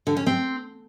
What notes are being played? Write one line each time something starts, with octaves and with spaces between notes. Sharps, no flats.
D3
C#4
C4